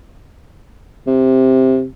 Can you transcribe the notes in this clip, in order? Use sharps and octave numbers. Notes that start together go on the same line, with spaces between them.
C3